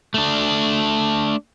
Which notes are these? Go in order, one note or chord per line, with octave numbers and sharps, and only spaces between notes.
A3 D4